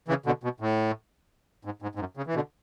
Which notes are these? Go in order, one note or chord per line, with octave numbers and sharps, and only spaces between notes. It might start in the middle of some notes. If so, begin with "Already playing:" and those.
C#3 E3
B2 D3
B2
A2
G#2
G#2
G#2
F#2
C#3
E3
B2 D3